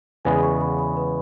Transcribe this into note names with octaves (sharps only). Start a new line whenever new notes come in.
E2 C#3 G#3 B3 G#5
C#6
B5
B5
B4